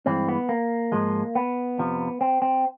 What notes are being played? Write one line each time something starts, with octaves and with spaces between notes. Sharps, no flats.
G2 E3 G#3 C4
B3
A#3
G#2 F3 G#3
B3
F2 C3 F3
C4
C4